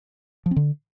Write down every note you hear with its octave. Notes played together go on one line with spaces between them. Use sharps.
F3
C4
D3